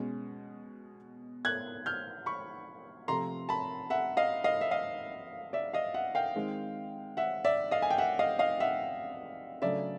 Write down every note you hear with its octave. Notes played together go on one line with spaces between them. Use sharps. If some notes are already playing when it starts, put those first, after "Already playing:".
Already playing: B2 G#3 C#4
F#6 G#6
F6 G6
B5 C#6
C3 F3 A3 A#5 C6
A5 B5
E5 F#5
D#5 F5
D#5 F5
E5
D#5 F5
D5 E5
D#5 F5
E5 F#5
F5 G5
D#3 G#3 C4
E5 F#5
D5 E5
D#5 F5
G#5
G5
E5 F#5
D#5 F5
D#5 F5
E5 F#5
C#3 F#3 A3 D4 D5 E5